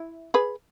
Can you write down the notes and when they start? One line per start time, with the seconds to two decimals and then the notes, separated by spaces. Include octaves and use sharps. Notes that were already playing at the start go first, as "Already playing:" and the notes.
Already playing: E4
0.34 G#4 B4